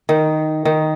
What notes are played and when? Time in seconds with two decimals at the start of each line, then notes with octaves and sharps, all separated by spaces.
0.09 D#3
0.65 D#3